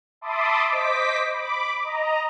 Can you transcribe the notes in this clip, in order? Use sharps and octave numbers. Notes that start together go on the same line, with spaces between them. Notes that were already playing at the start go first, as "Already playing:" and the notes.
E5 A5 B5 C6 D6 D#6
C5 D#5 D6 B6
B5 D6
D#5 A#5